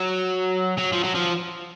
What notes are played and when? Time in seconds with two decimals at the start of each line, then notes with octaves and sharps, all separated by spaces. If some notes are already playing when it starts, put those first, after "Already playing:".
Already playing: F#3
0.78 F#3
0.93 F3
1.04 F#3
1.15 F3